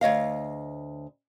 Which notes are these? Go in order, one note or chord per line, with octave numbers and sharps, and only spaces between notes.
D2 C#5 D#5 F5